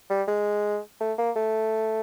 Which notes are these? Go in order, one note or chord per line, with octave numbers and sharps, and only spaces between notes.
G3
G#3
A3
A#3
A3